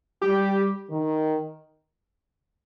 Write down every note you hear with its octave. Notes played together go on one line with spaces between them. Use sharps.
G3 G4
D#3